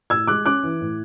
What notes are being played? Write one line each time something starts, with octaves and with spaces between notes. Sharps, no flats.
A2 E6 G#6
G#3 D6 F#6
C#4 D6 F#6
E3
A2